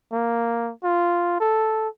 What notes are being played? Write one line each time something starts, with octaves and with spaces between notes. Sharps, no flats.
A#3
F4
A4